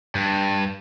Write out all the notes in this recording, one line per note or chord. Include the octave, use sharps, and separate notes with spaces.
G2